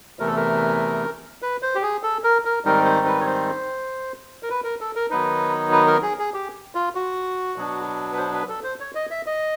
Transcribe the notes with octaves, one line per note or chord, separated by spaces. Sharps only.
E2 C3 E3 A3 A#4
A4
A#4
B4
C5
G4
G#4
A4
A#4
A#4
G#2 D#3 G3 C4 D#4 A#4
C5
B4
C#5
C5
A#4
B4
A#4
A4
A#4
D#3 F#3 B3 D#4 B4
B4
A#4
G#4
G#4
G4
F4
F#4
B2 F#3 B3 D4
B4
C5
B4
A4
C5
C#5
D#5
E5
D#5